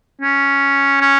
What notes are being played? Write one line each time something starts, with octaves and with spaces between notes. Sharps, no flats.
C#4
C#4